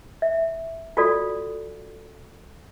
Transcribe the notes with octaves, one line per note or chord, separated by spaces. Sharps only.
E5
F4 F#4 A4 D5